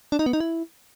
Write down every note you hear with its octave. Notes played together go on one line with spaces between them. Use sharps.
D4
D#4
B3
D#4
E4